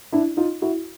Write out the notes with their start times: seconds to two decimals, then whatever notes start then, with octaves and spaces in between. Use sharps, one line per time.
0.13 D4 E4
0.37 D#4 F4
0.62 E4 F#4